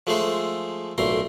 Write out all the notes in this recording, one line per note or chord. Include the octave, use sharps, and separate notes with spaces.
F3 G#3 A3 G#4 A4 C5
B1 A#2 A3 A#5 C6